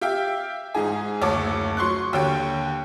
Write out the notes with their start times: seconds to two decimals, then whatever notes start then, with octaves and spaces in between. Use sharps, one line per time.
0.01 G4 E5 F5 G5
0.75 G#2 D#4 G#4
1.21 F#1 D2 C#5 A5 D6
1.77 F#3 C6 C#6 F#6
2.13 D#2 D3 C#5 G5